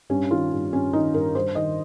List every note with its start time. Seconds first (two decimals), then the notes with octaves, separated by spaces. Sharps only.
0.10 G2 C#4
0.31 D#3 F4
0.52 G2
0.73 G2 C#4
0.93 D#3 D#4
1.14 G2 A#4
1.35 G2 C5
1.55 D#3 D#5